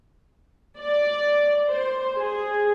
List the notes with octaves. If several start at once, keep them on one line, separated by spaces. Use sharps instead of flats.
D5
C5
G#4